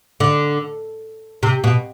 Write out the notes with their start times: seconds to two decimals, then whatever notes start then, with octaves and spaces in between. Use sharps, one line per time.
0.20 D3
1.43 C3
1.64 B2